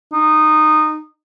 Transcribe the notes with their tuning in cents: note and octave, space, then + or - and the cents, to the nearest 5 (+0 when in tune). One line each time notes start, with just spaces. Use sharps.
D#4 -15